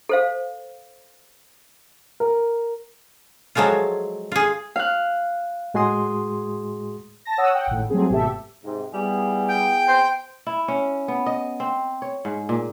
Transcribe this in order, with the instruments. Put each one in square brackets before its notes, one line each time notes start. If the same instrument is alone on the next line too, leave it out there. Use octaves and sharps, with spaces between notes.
[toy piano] A4 C5 F5
[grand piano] A#4
[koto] F3 F#3 G#3 A3 F4
F4 G#4
[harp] F5 F#6
[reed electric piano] A2 G#3 F#4 G#4 C6 D#6
[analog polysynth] A5 A#6
C#5 F#5 D#6 E6
F#5 G5
G#1 A2
F#3 G3 A3 C4 G#4
G#1 B2 G4 A4 E5
[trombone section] G#2 C3
[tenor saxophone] G3 [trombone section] B3 E4 G#4
[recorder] G5
[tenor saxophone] C5
[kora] E4
C#4
B3
D#5
C4
C#5
G#2
A#2